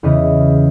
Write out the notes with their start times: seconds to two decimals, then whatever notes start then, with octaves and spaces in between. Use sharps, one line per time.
0.03 E2 C#3 E3 D#5